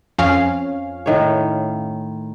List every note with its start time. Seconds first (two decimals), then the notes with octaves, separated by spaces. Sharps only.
0.18 F2 C#4 F5
1.06 A2 D#3 C#5